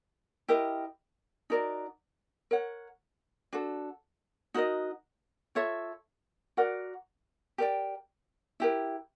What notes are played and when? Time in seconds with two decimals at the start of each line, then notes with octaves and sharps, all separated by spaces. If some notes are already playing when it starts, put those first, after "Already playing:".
0.48 E4 G4 A#4 D#5
1.50 D#4 F#4 A#4 D5
2.51 A#4 C#5 F#5
3.53 D4 F#4 A4
4.54 D#4 F#4 A#4 D#5
5.55 F4 A4 C#5 E5
6.57 F#4 A#4 D5 F#5
7.58 G4 A#4 D5 G5
8.60 E4 G4 A#4